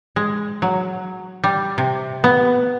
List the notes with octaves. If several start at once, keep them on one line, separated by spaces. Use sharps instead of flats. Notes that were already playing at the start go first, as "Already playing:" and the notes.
G#3
F#3
G3
C3
B3